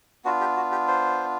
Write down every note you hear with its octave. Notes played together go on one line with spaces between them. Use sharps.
B3 D4 F4 F#4
G4
F#4
G4
C5